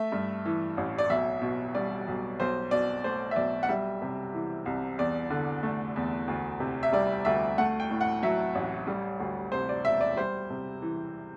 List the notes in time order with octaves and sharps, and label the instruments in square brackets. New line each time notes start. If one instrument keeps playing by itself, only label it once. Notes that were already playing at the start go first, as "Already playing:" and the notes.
Already playing: [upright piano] A3 E5
G2
E3
A1
D5
B1 E5
B2
G3 D5
B1
B1 C5
B2 D5
A3 C5
E5
B1 D5
F#5
G3 E5
C3
E3
C2
E2 D5
D3
A3
E2
D2
C3
E5
G3 D5
D2 E5
A3 F#5
G5
A2
F#5
F#3 E5
A1
G3
D2
C3 C5
D5
E1 E5
D5
G3 C5
C3
E3